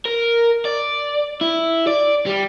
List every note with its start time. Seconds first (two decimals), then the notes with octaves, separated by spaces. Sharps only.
0.05 A#4
0.65 D5
1.41 E4
1.87 D5
2.26 G3